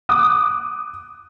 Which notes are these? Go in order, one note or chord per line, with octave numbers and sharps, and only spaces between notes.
D6 D#6 F#6